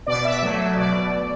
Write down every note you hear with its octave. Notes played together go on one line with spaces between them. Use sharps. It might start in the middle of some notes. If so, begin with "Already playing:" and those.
B2 D5
E5
F#3 A3
B2 D5